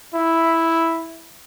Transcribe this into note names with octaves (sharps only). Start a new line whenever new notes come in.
E4